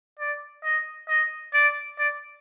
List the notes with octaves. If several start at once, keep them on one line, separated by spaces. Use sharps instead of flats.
D5
D#5
D#5
D5
D5